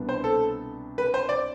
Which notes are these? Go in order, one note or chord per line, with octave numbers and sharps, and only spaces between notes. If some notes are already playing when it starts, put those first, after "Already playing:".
Already playing: C2 B2 B3 D4
C5
A4
B4
C5
D5